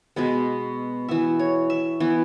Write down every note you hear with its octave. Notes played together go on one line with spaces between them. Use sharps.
B2 G#3 B3
E3 B3 E5
C#5
E5
E3 B3